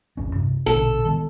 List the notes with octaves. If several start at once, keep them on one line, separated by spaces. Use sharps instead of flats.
G#1 E2 C#4
G2 C3
A#1 B2 D3 A4
D#3 G#3 B3